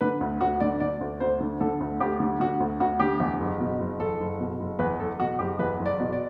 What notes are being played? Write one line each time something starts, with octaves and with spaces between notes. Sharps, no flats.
D3 B4
D2
D2 F#4
D3 D5
D3 D5
D2
D2 C5
D3
D3 A4
D2
D2 G4
D3
D3 F#4
D2
D2 F#4
D3 G4
E2
F#1
B2
F#1
E2 A4
F#1
B2
F#1
E2 B4
F#1 A4
B2 F#4
F#1 G4
E2 B4
F#1
D5
B2
D5